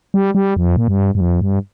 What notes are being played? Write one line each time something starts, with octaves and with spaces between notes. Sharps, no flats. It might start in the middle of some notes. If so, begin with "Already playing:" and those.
G3
G3
F2
A#2
G2
G2
F2
G2